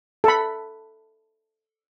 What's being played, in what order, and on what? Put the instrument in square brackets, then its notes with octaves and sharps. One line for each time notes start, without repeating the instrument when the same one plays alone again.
[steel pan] A4 B5